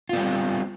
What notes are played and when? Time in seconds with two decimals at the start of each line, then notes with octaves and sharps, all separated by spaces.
0.09 F4
0.13 B3
0.17 G3
0.21 C4